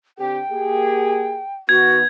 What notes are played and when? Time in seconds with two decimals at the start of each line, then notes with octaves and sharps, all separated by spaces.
0.18 D3 C4 G4 G5
0.50 A#3 G4 G#4
1.69 D#3 B3 F#4 G#6